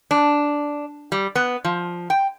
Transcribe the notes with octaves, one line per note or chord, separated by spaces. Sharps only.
D4
G3
B3
F3
G5